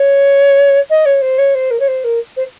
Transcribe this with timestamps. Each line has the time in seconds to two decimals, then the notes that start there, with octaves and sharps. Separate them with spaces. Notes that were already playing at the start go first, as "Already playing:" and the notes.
Already playing: C#5
0.90 D#5
1.05 C#5
1.22 C5
1.38 C#5
1.55 C5
1.71 A#4
1.80 C#5
1.88 C5
2.04 A#4
2.37 C5